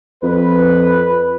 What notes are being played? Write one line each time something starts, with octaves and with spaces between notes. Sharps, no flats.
F2 B4